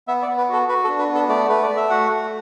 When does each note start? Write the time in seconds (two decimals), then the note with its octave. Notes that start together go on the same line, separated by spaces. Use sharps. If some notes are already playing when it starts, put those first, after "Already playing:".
0.08 B3 E5
0.22 D5
0.28 B3
0.38 B4
0.49 F#4 A4
0.68 F#4 B4
0.84 A4
0.88 D4
0.99 B4
1.09 B3
1.15 A4
1.29 A3 D5
1.49 A3 B4
1.62 D5
1.70 A3
1.77 E5
1.90 F#4 F#5
2.11 A3